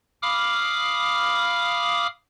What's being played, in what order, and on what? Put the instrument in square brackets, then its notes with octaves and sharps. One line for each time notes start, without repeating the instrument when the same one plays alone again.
[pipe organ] F5 B5 D6 D#6 F6